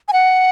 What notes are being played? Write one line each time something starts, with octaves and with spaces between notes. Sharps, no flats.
G#5
F#5